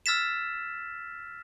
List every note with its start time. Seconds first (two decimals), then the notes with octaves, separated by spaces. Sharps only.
0.06 E6 F6 A6 B6 E7